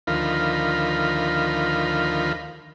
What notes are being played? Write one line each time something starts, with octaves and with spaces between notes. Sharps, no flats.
D2 D#3 F3 F4 A#4 B5